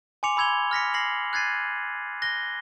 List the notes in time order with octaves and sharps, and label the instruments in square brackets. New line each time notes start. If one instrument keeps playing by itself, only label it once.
[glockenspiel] G#5 C6 D6 C#7 F7
B5 E6 G#6 F7 G7
F6 A#6 B6 C#7
A#6 C7 F#7
F#6 G#6 A6 C7 D#7
F#6 A#6 G7